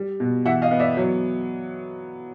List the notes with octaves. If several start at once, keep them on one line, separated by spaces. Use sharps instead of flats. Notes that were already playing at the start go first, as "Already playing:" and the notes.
Already playing: G3
B2
E3 E5 F#5
D#5 F5
B3
D5 E5
F#3